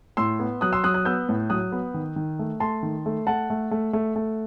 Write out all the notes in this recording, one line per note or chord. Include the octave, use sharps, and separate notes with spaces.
A2 C6 E6
B3
F#3 D#6 F#6
C6 E6
F#3 D#6 F#6
D#6 F#6
B3 E6 G6
A2
F#3 D#6 F#6
B3
D#3
D#3
A3
A3 A5 C6
D#3
A3
A3 F#5 A5
A3
A3
A3
A3